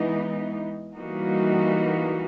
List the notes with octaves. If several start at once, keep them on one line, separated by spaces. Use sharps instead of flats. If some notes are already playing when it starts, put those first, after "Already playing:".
Already playing: E3 G#3 B3 D#4
E3 G3 A#3 D#4 F#4